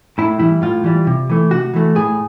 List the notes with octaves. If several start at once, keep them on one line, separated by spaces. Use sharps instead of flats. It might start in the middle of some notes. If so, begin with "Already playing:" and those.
A2 E4
E3 G3 E4
A2 F4
E3 G3
C3
E3 A3
C3 F#4
E3 A3
A2 G#4